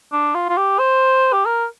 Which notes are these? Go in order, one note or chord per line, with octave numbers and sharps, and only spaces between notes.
D4
F4
F4
G4
C5
G4
A#4